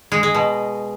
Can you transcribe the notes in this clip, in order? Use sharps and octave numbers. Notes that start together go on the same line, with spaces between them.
G#3
G#3
B2